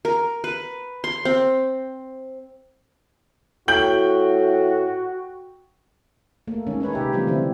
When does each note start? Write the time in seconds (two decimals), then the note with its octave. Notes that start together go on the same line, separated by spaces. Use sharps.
0.05 A#4
0.44 B4
1.04 C6
1.25 C4
3.68 A2 F#4 G5 G6 F#7
6.47 A3 A#3
6.67 D#3 G#3 C#4
6.80 C#4 D#4 B4 C#5
6.93 C3 G4 E5
7.13 E3 F3 G3 A3 C4 F4
7.27 D3 C4 E4